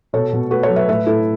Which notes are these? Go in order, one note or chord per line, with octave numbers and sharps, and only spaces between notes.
B2 A4 C#5
B2
A3 F#4 B4
A4 C#5
F#3
B4 E5
A2 B4 E5
A2 E4 A4